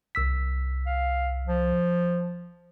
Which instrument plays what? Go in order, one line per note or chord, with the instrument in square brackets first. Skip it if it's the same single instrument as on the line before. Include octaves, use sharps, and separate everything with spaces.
[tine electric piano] C2 E6 B6
[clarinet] F5
F3